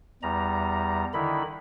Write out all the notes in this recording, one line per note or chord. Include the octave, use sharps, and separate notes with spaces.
E2 G3 A#5
D3 D#3 E4 B5